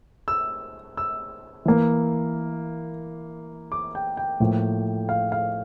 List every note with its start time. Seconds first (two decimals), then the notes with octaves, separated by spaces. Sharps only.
0.28 E6
0.97 E6
1.66 E3 A#3
3.72 D6
3.95 G5
4.17 G5
4.40 A2 F3 A#3
5.09 F5
5.32 F5